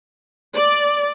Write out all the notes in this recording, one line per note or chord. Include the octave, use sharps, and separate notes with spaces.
D5